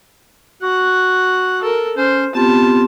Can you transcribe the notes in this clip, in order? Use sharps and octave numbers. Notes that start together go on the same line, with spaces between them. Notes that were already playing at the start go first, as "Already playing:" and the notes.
F#4 F#5
A4 A#4
C#4 C5
B3 C4 F4 G4 A5